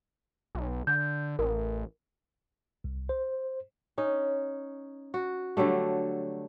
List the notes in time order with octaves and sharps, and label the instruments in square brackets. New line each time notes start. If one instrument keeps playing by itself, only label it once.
[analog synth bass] B1
[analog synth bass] D3 [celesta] G6
[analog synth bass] A1 [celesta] A#4
[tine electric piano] C2
C5
[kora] C#4 D#4
F#4
D3 F#3 G3 A3